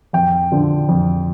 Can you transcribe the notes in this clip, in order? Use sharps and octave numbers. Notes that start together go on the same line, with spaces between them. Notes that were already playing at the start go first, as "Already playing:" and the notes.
F2 G5
D3 F3
F2